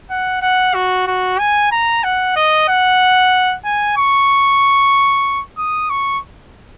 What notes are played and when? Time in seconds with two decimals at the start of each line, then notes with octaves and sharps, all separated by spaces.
0.10 F#5
0.42 F#5
0.74 F#4
1.07 F#4
1.39 G#5
1.72 A#5
2.04 F#5
2.36 D#5
2.68 F#5
3.64 G#5
3.97 C#6
5.58 D#6
5.90 C#6